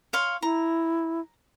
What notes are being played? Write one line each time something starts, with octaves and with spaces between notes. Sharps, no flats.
C#5 F5 C6
E4 A#5